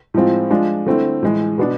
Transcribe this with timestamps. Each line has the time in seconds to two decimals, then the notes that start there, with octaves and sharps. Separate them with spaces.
0.14 A2 F3 G#3 C4 F4
0.50 F3 G#3 D4 F4
0.86 D3 A3 C4 E4
1.23 A2 E3 G#3
1.58 B2 B3 D4